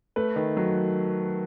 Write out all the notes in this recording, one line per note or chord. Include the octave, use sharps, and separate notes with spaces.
A3 B4
D#3
F#3